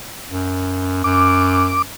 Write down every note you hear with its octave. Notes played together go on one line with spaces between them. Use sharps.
F#2
F#2 D6